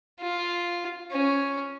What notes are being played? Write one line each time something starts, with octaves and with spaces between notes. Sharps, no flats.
F4
C#4